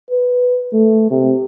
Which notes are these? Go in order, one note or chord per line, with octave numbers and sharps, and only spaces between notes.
B4
A3
C3